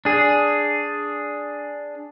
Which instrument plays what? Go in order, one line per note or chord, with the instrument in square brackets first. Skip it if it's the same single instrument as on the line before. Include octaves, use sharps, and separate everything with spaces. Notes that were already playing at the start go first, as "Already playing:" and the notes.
[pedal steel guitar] D4 G#4